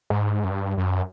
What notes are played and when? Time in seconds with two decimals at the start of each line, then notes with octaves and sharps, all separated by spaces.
0.10 G#2
0.44 F#2
0.50 G2
0.77 F#2